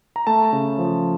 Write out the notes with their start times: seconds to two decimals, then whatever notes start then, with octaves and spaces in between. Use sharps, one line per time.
0.16 A#5
0.27 A3 A5
0.53 C#3
0.79 F3